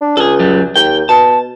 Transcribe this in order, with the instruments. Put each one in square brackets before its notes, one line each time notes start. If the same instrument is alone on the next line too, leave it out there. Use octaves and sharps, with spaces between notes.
[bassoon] D4
[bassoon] C#2 [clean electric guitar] G#4 A4
[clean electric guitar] F#2 F#3 G3
[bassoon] D#2 [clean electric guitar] G5
[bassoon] B2 [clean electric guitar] A5